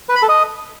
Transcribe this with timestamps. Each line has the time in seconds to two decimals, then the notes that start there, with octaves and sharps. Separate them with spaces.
0.09 B4
0.16 B5
0.22 A4
0.29 D#5